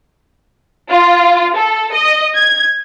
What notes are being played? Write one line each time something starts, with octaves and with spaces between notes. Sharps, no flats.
F4
A4
D#5
G#6